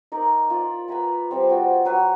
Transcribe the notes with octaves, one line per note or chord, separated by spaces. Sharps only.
D#4 A#4 D5
F4 D5
B4 G#5 A#5 B5
F3 G3 C4
F4 F#4 G5
F#3 B4 E6